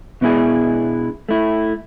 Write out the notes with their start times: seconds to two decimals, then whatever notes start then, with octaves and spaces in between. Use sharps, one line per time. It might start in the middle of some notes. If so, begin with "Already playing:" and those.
0.21 B2 B3 D4 E4 G#4
1.29 A3 E4